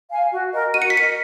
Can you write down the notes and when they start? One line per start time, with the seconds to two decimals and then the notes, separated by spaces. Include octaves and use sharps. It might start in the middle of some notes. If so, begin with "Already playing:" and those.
0.10 F5 G#5
0.31 F#4
0.53 A#4 D#5
0.74 F#4 D#7
0.82 C#7
0.90 B6
0.96 A#4 D#5 C#7